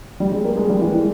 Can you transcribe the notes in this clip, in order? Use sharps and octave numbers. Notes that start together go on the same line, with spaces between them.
G3
G#3
A#3
G#3
G3
E3
G#3